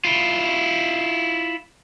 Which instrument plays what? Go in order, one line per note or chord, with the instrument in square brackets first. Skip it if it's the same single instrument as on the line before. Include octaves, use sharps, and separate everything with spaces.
[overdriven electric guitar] E4 F4